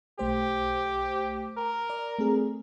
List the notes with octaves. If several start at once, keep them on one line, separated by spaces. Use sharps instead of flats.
B1 A3 G4 C5
A#4
D5
A3 C4 G#4